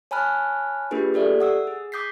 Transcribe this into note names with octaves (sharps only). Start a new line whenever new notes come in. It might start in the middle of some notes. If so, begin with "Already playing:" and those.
C#5 G#5 A5 B5 F6 F#6
A#3 D4 F4 G4 G#4 B4
G4 A4 D5 E5
F#5 D#6 E6
G#4
D6 D#6 G6 B6 C7